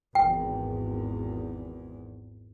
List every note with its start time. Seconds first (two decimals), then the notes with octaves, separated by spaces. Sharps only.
0.15 G#1 E2 G5